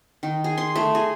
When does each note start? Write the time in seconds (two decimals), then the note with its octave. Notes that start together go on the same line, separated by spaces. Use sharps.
0.23 D#3
0.44 G#4
0.58 C6
0.76 A3
0.95 G#4